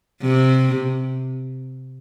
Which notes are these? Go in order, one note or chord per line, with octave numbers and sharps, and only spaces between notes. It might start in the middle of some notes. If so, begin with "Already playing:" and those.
C3